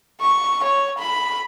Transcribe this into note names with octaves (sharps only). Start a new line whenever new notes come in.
C#6
C#5
B5